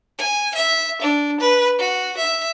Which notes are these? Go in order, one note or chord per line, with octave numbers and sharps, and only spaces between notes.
G#5
E5
D4
B4
F#4
E5